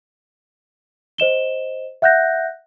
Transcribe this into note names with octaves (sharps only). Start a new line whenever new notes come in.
C5 D#5 E7 G7
E5 F#5 F#6 G6 A#6